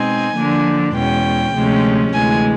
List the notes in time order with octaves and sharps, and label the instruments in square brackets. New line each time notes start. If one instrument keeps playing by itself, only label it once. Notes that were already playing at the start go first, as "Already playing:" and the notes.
Already playing: [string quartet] B2 G#3 C4 D#4 G#5
D3 F3 A#3 D4
E2 B2 G#3 C#4 G5
D2 C3 F3 G#3 C#4
D2 C3 E3 G#3 G#5